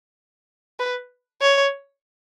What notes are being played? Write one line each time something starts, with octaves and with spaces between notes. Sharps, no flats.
B4
C#5